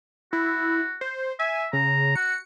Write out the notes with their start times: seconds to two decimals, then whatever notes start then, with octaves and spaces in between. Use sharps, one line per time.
0.33 E4 F#4
1.01 C5
1.39 E5 G#5
1.73 C#3 A#5
2.16 F#4 C#7